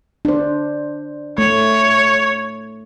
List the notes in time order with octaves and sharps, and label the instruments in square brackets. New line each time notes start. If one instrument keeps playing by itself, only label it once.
[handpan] D4 C5
[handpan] A3 [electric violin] C#5